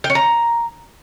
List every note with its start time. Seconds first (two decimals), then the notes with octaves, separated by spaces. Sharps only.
0.04 G5
0.10 C#5
0.15 A#5